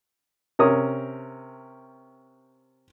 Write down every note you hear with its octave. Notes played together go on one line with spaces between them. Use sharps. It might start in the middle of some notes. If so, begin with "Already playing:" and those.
C3 C#4 A#4 D#6